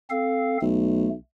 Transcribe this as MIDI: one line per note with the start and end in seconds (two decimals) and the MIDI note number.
0.10 0.58 60
0.10 0.58 69
0.10 0.58 77
0.62 1.14 35
0.62 1.10 57